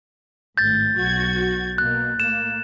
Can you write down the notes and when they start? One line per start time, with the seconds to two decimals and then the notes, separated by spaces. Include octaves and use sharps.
0.57 G#1 A2 G6 A6
0.96 B1 F#4 G#6
1.78 B2 A#3 F#6
2.20 A2 A#3 E7